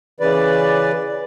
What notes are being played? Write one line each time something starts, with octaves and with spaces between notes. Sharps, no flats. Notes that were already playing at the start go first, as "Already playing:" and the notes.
C#3 E3 B4 D5